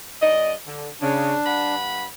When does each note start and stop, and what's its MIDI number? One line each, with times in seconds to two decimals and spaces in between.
0.22 0.53 43
0.22 0.53 74
0.22 0.53 75
0.66 0.88 50
1.01 1.34 49
1.01 1.75 62
1.46 2.04 43
1.46 2.04 78
1.46 2.04 83